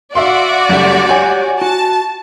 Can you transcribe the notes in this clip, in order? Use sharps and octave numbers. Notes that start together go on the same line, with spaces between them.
F#4 D5 E5 F5 C6
F#1 F#2 G3 A3
G4 C#5 F#5 G#5
F#4 A5